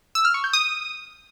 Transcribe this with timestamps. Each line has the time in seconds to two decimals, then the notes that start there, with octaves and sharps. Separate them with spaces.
0.15 E6
0.25 F6
0.34 C#6
0.44 G6
0.53 D#6